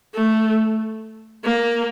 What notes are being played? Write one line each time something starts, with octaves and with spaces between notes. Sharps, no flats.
A3
A#3